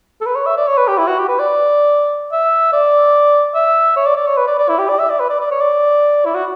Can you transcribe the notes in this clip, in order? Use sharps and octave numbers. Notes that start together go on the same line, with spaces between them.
A4
B4
C#5
E5
D5
C#5
B4
G4
E4
F#4
G4
B4
D5
E5
D5
E5
C#5
D5
D5
C#5
B4
D5
D5
E4
G4
D5
E5
D5
B4
D5
D5
C#5
D5
E4
F#4